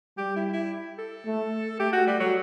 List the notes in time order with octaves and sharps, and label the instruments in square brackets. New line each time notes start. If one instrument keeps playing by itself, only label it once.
[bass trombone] G3 [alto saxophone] G4
[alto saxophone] E4
E4
A4
[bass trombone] A3
[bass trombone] A3 [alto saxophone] G4
[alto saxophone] F#4
G3
F#3